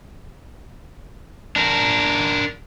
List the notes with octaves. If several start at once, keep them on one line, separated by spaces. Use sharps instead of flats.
D4 A#4